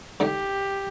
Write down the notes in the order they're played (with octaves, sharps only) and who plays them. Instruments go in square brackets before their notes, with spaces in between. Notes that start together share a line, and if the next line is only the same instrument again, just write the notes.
[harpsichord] D3 A3 D#4 [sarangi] G4